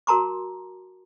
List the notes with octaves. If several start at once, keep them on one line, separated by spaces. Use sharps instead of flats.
F#4 A#4 A5 A#5 C6 D6